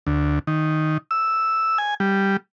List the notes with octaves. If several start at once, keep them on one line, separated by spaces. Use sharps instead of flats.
D2
D#3
E6
G#5
G3